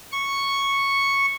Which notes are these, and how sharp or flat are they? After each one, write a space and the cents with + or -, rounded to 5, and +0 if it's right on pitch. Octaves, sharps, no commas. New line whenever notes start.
C#6 -5